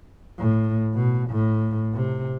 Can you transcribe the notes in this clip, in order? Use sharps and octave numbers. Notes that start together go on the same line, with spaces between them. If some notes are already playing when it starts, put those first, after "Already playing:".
A2
B2
A2
C3